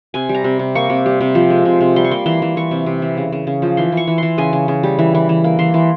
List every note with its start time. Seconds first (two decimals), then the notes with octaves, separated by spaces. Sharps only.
0.14 C3 G#5
0.29 G3
0.35 A#5
0.44 C3
0.59 C3
0.75 A#3 C#6
0.90 C3
1.06 G3
1.21 C3
1.35 F3
1.50 G#3
1.65 C3
1.81 C3
1.96 G3 C6
2.05 C#6
2.11 A#3 C6
2.26 E3 C6
2.42 E3
2.56 E3 C#6
2.71 C3
2.86 C3
3.02 E3
3.17 C#3
3.32 C#3
3.47 C#3
3.62 F3
3.77 E3 C6
3.92 E3
3.97 C#6
4.07 E3
4.18 E3 C6
4.38 C#3 G#5
4.53 C#3
4.68 C#3
4.83 G3
4.99 E3
5.15 E3
5.29 E3
5.44 A#3
5.59 E3 C6
5.74 E3